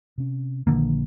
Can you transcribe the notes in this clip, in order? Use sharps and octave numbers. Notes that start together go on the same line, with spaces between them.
C3 C#4
A#1 D3 D#3 A#3